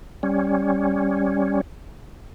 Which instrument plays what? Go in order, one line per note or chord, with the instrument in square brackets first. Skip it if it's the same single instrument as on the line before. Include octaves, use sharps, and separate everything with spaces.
[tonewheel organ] G3 C#4